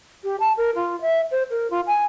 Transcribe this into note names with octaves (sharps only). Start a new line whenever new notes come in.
G4
A5
A#4
F4
E5
C5
A#4
F4
G#5